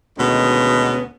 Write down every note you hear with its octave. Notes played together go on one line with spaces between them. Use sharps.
D2 B2 D#3 G#3 B3 C#4